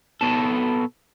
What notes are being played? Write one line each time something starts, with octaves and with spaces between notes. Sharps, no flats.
B2 A4